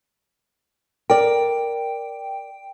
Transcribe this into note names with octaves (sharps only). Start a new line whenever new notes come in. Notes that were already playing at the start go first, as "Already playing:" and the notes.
A#4 D5 G5